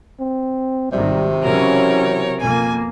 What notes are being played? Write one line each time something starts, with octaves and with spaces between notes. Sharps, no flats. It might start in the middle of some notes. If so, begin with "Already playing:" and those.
C4
G#1 C3 D#3 G3
C#3 E3 F#3 C#4 A#4 C#5
F2 B2 A#3 G#5